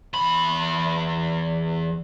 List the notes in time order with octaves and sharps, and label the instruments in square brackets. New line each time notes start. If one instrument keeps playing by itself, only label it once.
[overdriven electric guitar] E2 B5